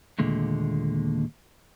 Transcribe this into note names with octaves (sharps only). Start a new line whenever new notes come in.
D#2 A#2 D3 G#3 A3